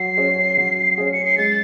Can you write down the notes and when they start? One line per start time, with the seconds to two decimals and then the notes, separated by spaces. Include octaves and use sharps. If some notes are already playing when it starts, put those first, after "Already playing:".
Already playing: F#3 C7
0.17 C#4 G#4
0.58 F#3
0.98 C#4 G#4
1.12 C#7
1.25 C7
1.38 G#3 A6